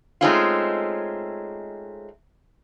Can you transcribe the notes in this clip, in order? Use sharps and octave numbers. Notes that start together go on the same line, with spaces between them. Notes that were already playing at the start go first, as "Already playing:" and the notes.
G#3 A3 C4 C#4 D#4 F4